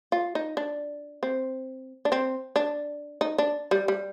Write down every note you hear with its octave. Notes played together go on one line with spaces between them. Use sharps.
F4
D#4
D4
C4
D4
C4
D4
D#4
D4
G3
G3